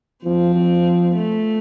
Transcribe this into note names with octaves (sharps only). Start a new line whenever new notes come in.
F3 C4
F3
A3